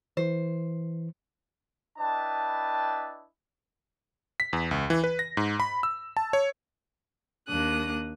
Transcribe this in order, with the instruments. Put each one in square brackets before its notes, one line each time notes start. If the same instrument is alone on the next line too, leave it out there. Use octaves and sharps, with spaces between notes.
[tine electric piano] E3 [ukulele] C5
[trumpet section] D4 E4 B4 D#5 G5 A5
[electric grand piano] B6
E2
C#2
E3
B4
A#6
G#2
B5
E6
A5
C#5
[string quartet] D#2 A#3 D4 D#6 F#6